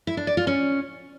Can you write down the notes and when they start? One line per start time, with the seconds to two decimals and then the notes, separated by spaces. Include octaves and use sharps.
0.07 E4
0.17 D4
0.27 D5
0.37 F4
0.47 C#4